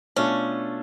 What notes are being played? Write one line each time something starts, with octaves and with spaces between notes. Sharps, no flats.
B2 A3 C#4 D4 F4 A4